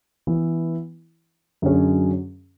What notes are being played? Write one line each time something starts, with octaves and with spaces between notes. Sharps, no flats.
E3 B3 E4
F#2 D3 F#3 C#4 G#4